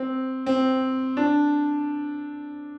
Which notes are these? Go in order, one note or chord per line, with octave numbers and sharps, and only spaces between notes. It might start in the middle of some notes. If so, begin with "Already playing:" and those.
Already playing: C4
C4
D4